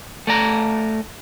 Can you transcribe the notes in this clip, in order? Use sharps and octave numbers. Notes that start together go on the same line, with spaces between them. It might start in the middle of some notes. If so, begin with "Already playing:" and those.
A3 D5 A#5